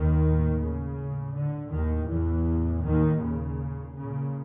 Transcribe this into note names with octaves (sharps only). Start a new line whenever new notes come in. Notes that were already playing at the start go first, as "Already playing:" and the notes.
Already playing: D#2 D#3
A2
C#3
A2
D3
D#2 A2 D#3
E2 E3
A2
D#2 D#3
A#2 C#3
A#2 C#3